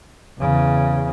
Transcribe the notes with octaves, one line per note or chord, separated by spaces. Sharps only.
E2 C#3